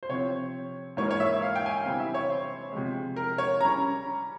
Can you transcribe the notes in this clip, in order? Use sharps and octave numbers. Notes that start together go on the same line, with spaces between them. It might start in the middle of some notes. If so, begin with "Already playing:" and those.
C5
C3 F3 C4 C#5
G#2 E3 A#3 C#5
C#5
E5
F5
G5
G#5
G5
C3 E3 G3 C4
E5
C#5
C5
C3 F3 G#3
A#4
C#5
C#3 G3 C#4 A#5